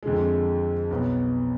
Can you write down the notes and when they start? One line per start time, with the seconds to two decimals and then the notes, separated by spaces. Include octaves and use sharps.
0.03 F2 D3 G#3
0.91 B1 B2 B3